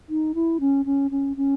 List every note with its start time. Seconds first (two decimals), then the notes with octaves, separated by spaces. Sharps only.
0.09 D#4
0.35 E4
0.60 C#4
0.85 C#4
1.11 C#4
1.36 C#4